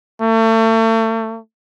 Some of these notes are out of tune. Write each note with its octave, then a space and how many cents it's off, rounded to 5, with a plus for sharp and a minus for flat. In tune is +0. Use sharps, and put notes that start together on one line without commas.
A3 +35